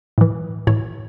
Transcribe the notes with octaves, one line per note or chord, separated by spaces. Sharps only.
A2 E3
A2 E3 C#5